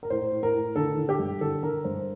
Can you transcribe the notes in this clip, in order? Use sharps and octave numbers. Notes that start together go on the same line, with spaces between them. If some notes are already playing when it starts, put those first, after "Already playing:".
A#4
A2 C5
A2
A#4
A2
D3 A4
D3
G4
G2
D3 A4
D3 A#4
G2 C5